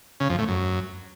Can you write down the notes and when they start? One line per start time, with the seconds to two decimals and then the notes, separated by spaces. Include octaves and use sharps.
0.20 C#3
0.30 F2
0.39 A2
0.48 F#2